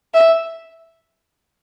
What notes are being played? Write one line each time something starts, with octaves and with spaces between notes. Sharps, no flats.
E5